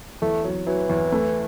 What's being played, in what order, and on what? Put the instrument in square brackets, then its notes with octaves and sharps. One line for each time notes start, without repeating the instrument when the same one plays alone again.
[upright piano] E2 [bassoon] A3
[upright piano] F#3
[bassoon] E3 [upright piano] F#3
[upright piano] E2
A3